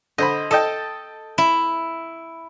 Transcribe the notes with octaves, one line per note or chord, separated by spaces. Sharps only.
D3 C5 D#5 B5
A4 D#5 G5 A5
E4